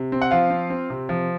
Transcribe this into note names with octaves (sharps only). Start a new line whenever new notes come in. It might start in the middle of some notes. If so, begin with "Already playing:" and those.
Already playing: C3
C4
F#5
F3 F4 F5
C4
C4
C3
F3